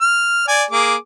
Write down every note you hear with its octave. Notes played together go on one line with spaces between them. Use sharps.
F6
D5 G#5
A#3 G#4 D6